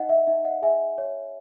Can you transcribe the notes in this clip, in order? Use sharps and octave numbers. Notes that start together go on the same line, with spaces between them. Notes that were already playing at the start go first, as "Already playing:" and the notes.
Already playing: D#4 D#5 F#5
E5
D#4 E5
D#5 F#5
G#4 E5 G#5
C#5